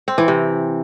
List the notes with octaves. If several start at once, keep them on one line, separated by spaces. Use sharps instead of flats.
C4
E3
C3